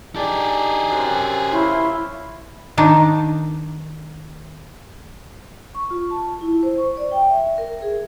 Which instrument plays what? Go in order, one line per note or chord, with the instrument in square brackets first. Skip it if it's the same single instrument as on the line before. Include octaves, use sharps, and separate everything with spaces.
[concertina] D4 D#4 A5 [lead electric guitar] G4 G#4
[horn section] F#2 C3
[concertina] C#4 F4 C6 [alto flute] E4
[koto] D#3 D4 D#4
[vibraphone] C#6
F4
A5
E4
C5
C#6
D5
G5
E5
A#4
G#4